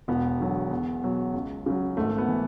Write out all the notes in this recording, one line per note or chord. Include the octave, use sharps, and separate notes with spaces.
E1 B3
E2 D3 F#3
E2
B2 F#3
C#2
C#3 F#3
G#1 A3
B3
E3